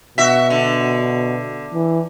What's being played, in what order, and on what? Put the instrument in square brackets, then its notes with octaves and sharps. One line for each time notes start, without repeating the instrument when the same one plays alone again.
[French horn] B2 [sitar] F#4 E5
[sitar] D3
[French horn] E3